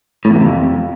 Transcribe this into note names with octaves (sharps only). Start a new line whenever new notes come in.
A2
E2
A#2
C3
F2